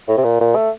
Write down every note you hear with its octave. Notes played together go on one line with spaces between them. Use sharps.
A2
C3
A#2
A#2
A3